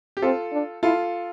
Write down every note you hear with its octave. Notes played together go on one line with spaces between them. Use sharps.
G4
C4 F4 A4
D4
E4 F4 A4